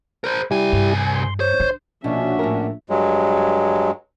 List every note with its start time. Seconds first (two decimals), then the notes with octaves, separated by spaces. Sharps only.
0.24 A#4 C5
0.51 C2 G3 E4 G4 G#5
0.73 G2
1.15 C6
1.40 C5 C#5
1.60 D4
2.04 A#1 B2 C#4 D4 F#4 E5
2.39 A2 A#4
2.90 G2 F#3 G#3